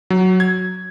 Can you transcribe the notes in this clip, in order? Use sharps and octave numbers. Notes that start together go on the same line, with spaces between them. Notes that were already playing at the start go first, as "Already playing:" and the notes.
F#3
G#6